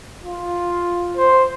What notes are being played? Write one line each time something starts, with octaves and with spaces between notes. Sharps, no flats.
F4
C5